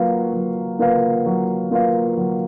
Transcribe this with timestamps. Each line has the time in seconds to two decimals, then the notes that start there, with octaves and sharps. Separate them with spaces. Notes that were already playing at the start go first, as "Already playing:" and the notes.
Already playing: F#3 A#3 F4 B4 F5
0.33 F#3
0.79 A#3 F4 B4 F5
1.26 F#3
1.71 A#3 F4 B4 F5
2.17 F#3